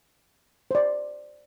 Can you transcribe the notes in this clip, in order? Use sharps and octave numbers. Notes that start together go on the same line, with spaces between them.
C5 D5